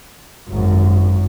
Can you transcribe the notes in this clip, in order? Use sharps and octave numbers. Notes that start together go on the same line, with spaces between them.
G#1 F#2